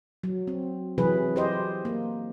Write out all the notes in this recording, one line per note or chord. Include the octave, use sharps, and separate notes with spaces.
F#3
C4
C3 E3 F#3 G#4 B4
G4 C5 D#5
A#3